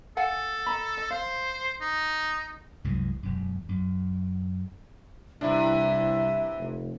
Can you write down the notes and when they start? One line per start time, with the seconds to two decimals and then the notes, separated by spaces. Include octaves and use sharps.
0.17 A4 F5 F#5 G#5
0.67 D#5 A#5 B5
0.97 D#5
1.11 C5 F5
1.81 D#4
2.84 C2 F#2 E3 G#3
3.23 E1 F#2
3.69 F#2
5.41 C2 C3 E3 D4 E4 E5
6.59 F1